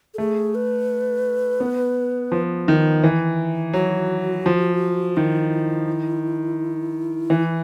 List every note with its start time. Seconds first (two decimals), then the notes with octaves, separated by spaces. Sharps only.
0.14 A4
0.18 A3 G#4
0.55 B4
1.60 B3
2.32 F3
2.68 D#3
3.03 E3
3.73 F#3 F#4
4.46 F3
5.17 D#3 E4
7.30 E3